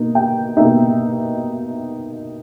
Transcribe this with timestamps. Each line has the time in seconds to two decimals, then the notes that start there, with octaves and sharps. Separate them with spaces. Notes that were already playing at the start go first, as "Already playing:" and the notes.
Already playing: B2 A#3 D#4
0.15 G5
0.57 B2 A#3 D#4 E5